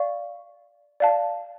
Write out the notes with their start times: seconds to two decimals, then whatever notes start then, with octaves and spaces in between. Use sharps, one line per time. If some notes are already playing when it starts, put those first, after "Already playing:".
Already playing: D5 F5 C#6
1.00 D5 F5 A5